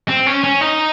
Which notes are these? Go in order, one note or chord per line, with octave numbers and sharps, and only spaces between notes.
C4
C#4
C#4
D#4